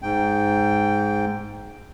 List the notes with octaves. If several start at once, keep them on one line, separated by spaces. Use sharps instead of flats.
G#2 G5